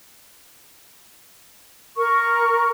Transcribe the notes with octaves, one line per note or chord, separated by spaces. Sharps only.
A#4 C#6